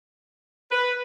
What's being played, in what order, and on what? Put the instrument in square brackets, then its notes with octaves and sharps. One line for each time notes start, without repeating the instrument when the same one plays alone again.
[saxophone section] B4